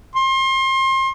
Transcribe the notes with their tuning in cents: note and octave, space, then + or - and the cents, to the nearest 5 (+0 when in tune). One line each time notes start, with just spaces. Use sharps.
C6 +30